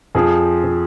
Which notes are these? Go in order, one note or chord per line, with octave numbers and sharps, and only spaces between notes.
F2 F3 G#4
F3